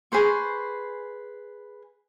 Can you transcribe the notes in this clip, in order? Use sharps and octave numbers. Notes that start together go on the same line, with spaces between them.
G#4 B4 C5 C#6